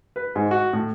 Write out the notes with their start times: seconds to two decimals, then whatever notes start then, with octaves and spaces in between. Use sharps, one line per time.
0.16 B4
0.36 G#2
0.51 F#4
0.73 A2